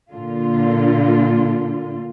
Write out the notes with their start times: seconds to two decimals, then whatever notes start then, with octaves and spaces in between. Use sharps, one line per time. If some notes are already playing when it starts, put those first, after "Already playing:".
0.12 A#2 D3 F4